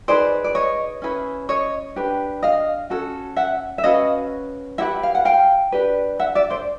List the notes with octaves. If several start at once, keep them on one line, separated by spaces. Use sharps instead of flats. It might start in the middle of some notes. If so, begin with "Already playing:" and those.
D#4 G#4 B4 C5 D5
D5
C#5 D#5
C#4 E4 G#4 B4
C#5 D#5
D4 G4 B4
D#5 F5
C#4 F#4 A4
E5 F#5
E5
C#4 F#4 B4 D#5 F5
E4 G4 B4 E5 F#5
F5
F#5
F5 G5
D4 G4 B4
E5 F#5
D5 E5
C5 D5